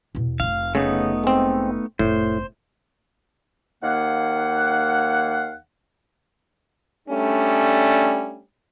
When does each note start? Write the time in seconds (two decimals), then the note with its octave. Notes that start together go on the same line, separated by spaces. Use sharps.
0.15 E2 B2
0.40 F1 F4 F5
0.75 C#3 A3 B3 D#4
1.24 G#3 C4
1.99 F1 A2 B3 C5
3.83 D#2 D#3 A#3 F5 F#5
7.09 G3 A3 C#4 D4